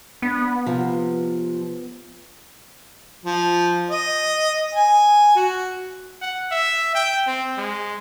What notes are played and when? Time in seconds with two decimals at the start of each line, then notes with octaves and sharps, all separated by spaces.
0.22 B3 D4
0.66 C3 F3
3.25 F3
3.90 D#5
4.75 G#5
5.36 F#4
6.22 F#5
6.52 E5
6.95 G5
7.27 C4
7.58 G#3